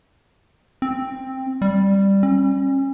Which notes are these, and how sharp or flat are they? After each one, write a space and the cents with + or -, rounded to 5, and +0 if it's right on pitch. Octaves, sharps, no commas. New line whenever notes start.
C4 +10
G3 +5
C#4 -35